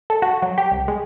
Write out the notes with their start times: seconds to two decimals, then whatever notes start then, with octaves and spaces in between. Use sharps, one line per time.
0.10 A4
0.22 F#4
0.42 F#3
0.58 G4
0.71 C2
0.88 G#3